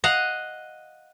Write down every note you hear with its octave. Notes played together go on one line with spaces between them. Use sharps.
D#5 F5 F#5